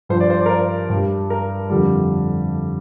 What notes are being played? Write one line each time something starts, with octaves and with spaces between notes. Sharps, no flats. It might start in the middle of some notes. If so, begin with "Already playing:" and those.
G2 F3 C5
D5
C5
D5
A#4
C5
G2
G3
A#4
F2 D3 G3